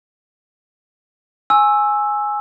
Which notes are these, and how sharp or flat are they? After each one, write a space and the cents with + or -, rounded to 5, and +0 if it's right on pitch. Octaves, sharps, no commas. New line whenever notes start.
G#5 +0 C#6 -45 E6 +0